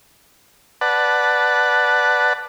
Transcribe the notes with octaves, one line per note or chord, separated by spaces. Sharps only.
B4 D5 F#5 A5